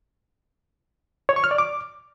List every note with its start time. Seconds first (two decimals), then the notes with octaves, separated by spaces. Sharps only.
1.29 C#5
1.36 C#6
1.44 F6
1.51 D5
1.58 D6